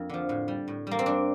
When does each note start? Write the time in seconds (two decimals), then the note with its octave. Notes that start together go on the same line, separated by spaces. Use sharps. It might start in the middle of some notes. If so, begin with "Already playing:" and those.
Already playing: F2 A#3 D4
0.09 D3 F3
0.29 A2
0.48 G3
0.68 A2
0.87 G3 A#3
0.99 C4
1.06 G2 D4